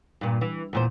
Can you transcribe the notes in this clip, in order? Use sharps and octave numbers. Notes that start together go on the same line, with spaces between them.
G2 A#2
E3
E2 A#2 C5